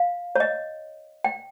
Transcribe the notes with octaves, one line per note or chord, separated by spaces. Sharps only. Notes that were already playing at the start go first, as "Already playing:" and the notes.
Already playing: F5
C#5
D#5
G5